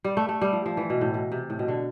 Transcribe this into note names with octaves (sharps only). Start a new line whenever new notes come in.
G3
A3
A3
G3
F3
F3
E3
B2
A2
B2
C3
A2
B2
D3